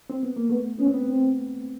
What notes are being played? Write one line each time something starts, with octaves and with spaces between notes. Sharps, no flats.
C4
B3
A#3
A3 B3
B3 C#4
C4
B3
C4